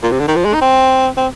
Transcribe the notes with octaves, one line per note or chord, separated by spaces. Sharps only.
A#2
C3
D3
D#3
F3
G#3
D#4
C4
C4